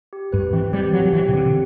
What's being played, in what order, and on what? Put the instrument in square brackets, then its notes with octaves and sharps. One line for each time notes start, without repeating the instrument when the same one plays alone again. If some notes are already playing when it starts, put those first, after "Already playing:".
[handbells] G4
[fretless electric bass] G2 [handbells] B4
[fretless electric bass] E3 [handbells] C4
[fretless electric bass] G3 [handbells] G4
[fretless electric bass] F#3 [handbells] G4
[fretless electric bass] F#3
[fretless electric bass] E3 [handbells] C4
[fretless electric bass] C3
[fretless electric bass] D3 [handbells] G4